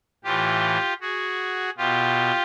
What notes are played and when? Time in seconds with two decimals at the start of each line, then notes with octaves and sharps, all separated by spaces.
0.24 A2 E3 F4 G4
1.01 F#4 G#4
1.78 B2 F4 G4